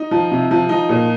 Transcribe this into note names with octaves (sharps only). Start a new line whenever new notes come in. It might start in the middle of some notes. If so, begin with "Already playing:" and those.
Already playing: D#4
F3
C3
F3
F3 D#4
A#2